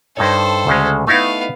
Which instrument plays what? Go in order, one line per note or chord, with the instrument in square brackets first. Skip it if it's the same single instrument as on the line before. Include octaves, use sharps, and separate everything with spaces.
[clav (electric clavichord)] G2 D#4 C#5 [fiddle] A4 C5
[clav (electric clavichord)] D2 C#3 G#3
[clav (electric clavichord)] A3 D#4 E4 [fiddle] B3 F5